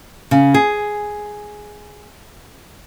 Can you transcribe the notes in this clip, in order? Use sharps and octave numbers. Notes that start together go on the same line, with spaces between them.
C#3
G#4